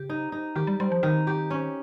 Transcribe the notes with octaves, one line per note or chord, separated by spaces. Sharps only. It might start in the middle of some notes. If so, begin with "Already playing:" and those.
Already playing: C#3 G4
D#4
D#4
D#3 G4
G3
G3 C4
F3
D#3 D#4
G4
C#4